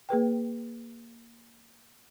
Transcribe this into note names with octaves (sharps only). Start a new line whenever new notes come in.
A#3 G#4 B4 G5